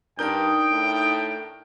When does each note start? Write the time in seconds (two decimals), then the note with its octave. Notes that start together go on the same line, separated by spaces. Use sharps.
0.19 G2 D4 D#4 A#4 G5 D#6 G6
0.71 A2